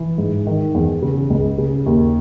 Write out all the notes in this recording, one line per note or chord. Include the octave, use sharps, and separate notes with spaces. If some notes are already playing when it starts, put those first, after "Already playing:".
Already playing: E3
G#2
D#3
E2
C#3
C#2
C#3
D#2